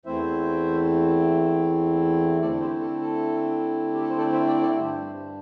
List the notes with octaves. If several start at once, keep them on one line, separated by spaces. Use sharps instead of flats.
E2 E3 A3 C4 E4 C5 E5
D3 A3 C4 E4 A4 D5
G4 C5
A4
A4
G4
A4
C5
A4 D5
C5 E5
D5 G5
A4 D5
G2 G3 D4 G4 C5